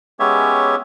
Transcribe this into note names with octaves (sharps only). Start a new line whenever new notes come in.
G#3 B3 C#4 G4 C#5 E5